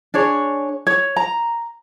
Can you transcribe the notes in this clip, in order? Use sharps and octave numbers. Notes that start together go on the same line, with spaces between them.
D4 G#4 C#5
C#5
A#5